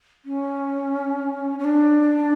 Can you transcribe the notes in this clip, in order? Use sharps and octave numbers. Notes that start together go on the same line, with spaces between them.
C#4
C#4
D4